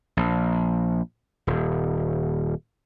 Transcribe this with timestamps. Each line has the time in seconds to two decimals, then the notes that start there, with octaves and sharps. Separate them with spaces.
0.17 A#1
1.47 D#1